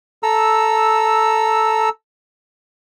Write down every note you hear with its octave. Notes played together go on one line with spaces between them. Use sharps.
A4 A#5 E6